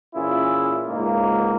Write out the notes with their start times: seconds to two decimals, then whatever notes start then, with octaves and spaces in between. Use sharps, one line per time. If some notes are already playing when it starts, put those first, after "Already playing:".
0.15 A#2 E3 C#4 E4 F4 G#4
0.88 C#2 G#2 G#3 A#3